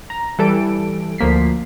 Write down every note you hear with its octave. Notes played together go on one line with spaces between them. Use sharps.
A#5
E3 G3 A4 D7
D2 F3 A#3 B6 C7